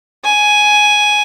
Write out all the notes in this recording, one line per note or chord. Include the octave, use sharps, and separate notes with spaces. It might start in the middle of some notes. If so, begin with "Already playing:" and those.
G#5